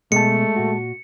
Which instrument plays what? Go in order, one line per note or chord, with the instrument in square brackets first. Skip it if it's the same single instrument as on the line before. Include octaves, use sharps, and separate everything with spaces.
[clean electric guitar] B2 [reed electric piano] G#3 A5 [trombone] A3 [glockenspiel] C#7
[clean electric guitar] A#2 F#4